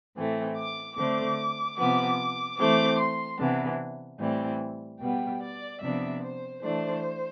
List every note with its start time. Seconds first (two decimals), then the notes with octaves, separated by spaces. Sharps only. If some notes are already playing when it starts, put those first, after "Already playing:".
0.16 A2 E3 A3 C4
0.56 D6
0.96 D3 A3 C4 D6
1.77 C3 F3 B3 D6
2.58 E3 A3 C4 D6
2.99 C6
3.39 C3 E3 B3 D4
4.19 A2 E3 G3 C4
5.00 B2 G3 B3 G5
5.41 D5
5.81 C3 F3 B3 D4 E5
6.22 C5
6.62 E3 A3 D4 C5